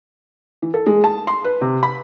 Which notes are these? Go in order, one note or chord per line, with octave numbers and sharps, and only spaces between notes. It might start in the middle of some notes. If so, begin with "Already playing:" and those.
E3
A4
G#3
A5
C6
B4
C3
B5